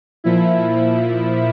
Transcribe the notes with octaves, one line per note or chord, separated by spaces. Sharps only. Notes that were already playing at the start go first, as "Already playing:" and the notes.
A#2 F3 E4